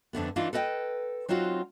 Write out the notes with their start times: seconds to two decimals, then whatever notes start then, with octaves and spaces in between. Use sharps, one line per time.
0.13 F2 D3 A3 B3
0.36 E3 D4 D#4 F4
0.53 A4 B4 D#5 F#5 G5
1.29 F#3 C4 D#4 F4 F#4